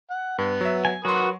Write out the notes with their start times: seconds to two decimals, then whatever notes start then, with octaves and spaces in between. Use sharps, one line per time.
0.10 F#5
0.38 G2 B3
0.61 F#3 E5
0.85 G#5
1.05 F#3 F#4 A#4 B4 C6 D#6